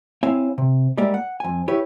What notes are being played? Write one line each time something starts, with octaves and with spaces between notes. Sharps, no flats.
C4 E4 C#5 E5 F5 G#5
C3
G3 G#3 A#3 A#4 D5 E5
F#5
F2 G#5
E4 G4 B4 C#5